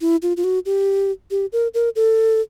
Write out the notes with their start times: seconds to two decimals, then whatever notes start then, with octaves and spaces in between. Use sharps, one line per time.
0.01 E4
0.22 F4
0.37 F4
0.44 F#4
0.66 G4
1.31 G4
1.53 A#4
1.74 A#4
1.96 A4